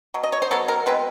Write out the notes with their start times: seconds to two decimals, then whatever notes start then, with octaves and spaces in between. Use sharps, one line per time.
0.14 B2 F#3
0.23 D#5
0.32 C#5
0.42 C5
0.51 B2 F#3 B3 A4
0.68 A#4
0.86 B2 G#3 C4 B4